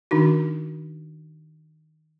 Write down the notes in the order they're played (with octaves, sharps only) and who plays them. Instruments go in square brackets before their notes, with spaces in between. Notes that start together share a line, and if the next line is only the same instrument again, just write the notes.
[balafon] D#3 D4 D#4 F#4